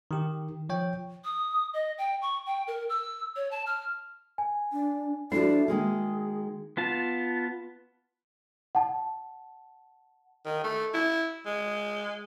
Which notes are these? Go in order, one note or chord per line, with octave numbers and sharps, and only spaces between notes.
D#3 G4
F3 C#5 G5
D#6
D#5
G5
C#6
G5
A#4
E6
C#5
A5
F6
G#5
D4
F3 A3 D4 E4 F#4 C7
D#3 G#3 A#3 G#4
B3 F4 A5
F#5 A5
D#3
A3
E4
G#3